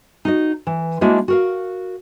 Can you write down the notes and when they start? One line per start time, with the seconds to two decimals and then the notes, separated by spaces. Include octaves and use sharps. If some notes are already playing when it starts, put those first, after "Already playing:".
0.25 D#4 F#4 D#5
0.67 E3
1.01 G#3 A#3 D4 E4 F#4 C5
1.28 F#4 A#4 F5